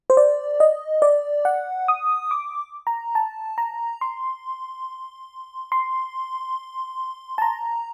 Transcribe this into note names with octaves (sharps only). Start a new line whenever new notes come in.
C5
D5
D#5
D5
F#5
D#6
D6
A#5
A5
A#5
C6
C6
A5
A#5